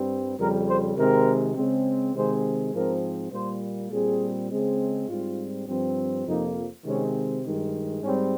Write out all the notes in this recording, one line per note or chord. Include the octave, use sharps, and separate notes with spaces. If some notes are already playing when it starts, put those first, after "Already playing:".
Already playing: G2 G3 C4
F2 C#3 G3 A#4
C5
C3 D#3 G#3 C4 A#4
C#3 G#3 C4
C3 D#3 G#3 C4 C5
G#2 F3 C4 A#4
A#2 G3 A#3 C5
A#2 G3 C4 G#4
C#3 G#3 C4
G#2 G3 C4 F4
G2 F3 C4
F2 C3 F3 A#3 D#4
C3 D#3 G#3 C4 C#4
G2 D#3 G#3
G#2 G3 C4 C#4